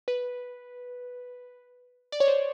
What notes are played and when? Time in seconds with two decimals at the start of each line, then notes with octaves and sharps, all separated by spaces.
0.08 B4
2.12 D5
2.20 C#5
2.28 C5